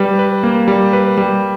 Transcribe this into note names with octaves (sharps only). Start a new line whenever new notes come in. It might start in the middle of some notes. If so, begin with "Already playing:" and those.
Already playing: G3 B4
B4
A#3
G3
B4
G3